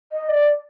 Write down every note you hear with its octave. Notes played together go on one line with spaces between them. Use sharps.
D#5
D5